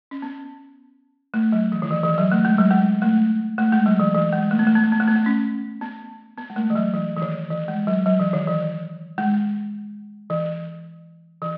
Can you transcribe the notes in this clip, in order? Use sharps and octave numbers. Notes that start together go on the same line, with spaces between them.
C#4
B3
A3
F#3
E3
D#3
E3
E3
F#3
A3
G#3
F#3
G#3
A3
A3
G#3
F#3
E3
E3
G#3
A3
B3
A3
B3
A3
B3
A3
B3
A3
C#4
B3
B3
G#3
A3
E3
F#3
E3
E3
D#3
E3
G#3
F#3
F#3
E3
D#3
E3
G#3
E3
E3